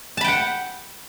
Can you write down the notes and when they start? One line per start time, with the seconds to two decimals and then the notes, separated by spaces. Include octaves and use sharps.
0.17 A5
0.21 B5
0.24 G5
0.28 F#5